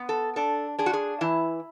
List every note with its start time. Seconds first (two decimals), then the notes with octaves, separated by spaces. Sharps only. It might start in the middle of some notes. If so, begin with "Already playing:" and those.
Already playing: B3
0.09 A4
0.36 D4 A4
0.79 D4 G#4
0.86 F#4
0.93 G#4
1.21 E3 E4